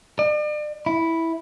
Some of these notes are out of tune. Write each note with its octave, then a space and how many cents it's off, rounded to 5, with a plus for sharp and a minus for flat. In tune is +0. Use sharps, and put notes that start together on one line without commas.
D5 +40
E4 -5